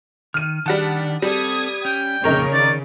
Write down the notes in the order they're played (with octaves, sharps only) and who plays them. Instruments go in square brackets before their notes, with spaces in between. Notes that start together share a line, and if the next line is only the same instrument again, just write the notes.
[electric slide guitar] D#3 [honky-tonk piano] F6 D#7
[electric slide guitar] D#3 D4 [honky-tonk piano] G3 F#5 A5
[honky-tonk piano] G3 [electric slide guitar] C4 A4 [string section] D#6 G#6
[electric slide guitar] C#4 [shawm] G5
[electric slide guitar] F2 A#2 [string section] C#3 [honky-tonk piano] D#4 A#4 C#5
[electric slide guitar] D#3 [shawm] D5